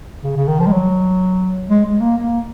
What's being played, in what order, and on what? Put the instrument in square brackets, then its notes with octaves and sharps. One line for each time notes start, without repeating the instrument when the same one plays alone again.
[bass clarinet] C#3
C#3
D#3
F3
G#3
F#3
G#3
G#3
A#3
A#3